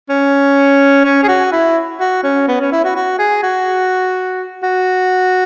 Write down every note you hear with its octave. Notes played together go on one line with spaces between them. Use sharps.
C#4
C#4
G#4
F#4
E4
F#4
C#4
B3
C#4
E4
F#4
F#4
G#4
F#4
F#4